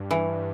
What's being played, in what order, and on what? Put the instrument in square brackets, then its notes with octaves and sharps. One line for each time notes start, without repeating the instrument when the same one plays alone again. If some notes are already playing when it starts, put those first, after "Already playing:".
Already playing: [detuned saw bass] G2
[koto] E3